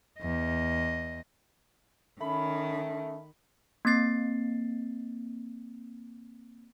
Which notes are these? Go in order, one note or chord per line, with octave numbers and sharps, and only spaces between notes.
E2 D#5
D#3 A3 C#4 B5
A#3 C4 A6 C7